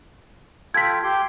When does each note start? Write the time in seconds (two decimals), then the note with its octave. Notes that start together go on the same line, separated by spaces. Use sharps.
0.74 F4 A4 G5 G#6 B6
1.03 G4 G5 C6